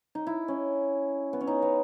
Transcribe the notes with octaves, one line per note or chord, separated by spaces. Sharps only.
D#4
E4
C#4
B3
C#4
D#4
B3